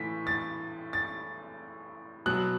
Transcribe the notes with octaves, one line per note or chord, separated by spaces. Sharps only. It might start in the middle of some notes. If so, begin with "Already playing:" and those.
Already playing: A2 E3 B6
A6
A6
B2 F#3 F#6